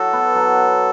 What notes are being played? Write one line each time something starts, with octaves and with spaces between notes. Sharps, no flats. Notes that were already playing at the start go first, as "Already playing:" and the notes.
Already playing: F#3 F#4 A4
B3
F#3